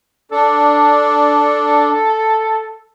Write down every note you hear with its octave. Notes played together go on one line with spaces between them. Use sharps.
D4 A4